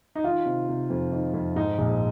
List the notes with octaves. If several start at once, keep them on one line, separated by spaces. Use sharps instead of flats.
D#4
D#3 F4
C3
C3
F2
D#3
F2
G#2 D#4
A#1